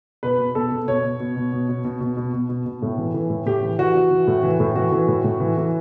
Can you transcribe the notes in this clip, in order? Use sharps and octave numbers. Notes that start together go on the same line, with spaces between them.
B2 B4
B2
B2 A4
B2
B2 C#5
B2
B2
B2
B2
B2
B2
B2
B2
B2
B2
B2
A2
E3
E3
A2
A2 G4
E3
E3 F#4
E3
E3
A2
E3
A2
E3 F#4
E3
A2
A2
E3
E3